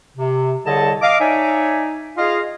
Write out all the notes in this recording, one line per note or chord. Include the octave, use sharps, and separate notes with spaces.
C3
C2 D3 G#4 C#5 D#5 A5
D#5 F5 D6
D#4 C#5 D5 E5 G#5
F4 G#4 D#5 F5